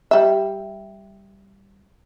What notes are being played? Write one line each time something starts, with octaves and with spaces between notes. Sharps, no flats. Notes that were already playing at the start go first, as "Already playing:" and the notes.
G3 E5